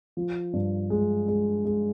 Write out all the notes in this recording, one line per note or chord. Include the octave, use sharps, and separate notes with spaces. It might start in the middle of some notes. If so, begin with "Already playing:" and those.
F3
G2
G#3
G#3
G#3